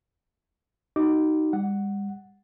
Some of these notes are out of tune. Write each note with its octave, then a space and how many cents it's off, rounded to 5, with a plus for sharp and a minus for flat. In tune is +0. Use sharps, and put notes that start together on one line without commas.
D#4 +0 F#4 +40 D6 +0
G3 +40 F#5 +0